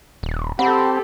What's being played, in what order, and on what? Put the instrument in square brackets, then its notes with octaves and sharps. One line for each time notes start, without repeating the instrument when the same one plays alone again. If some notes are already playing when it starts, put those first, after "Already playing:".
[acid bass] D#1
[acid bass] C4 [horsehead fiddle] G4 A4 [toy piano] F#5 [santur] B5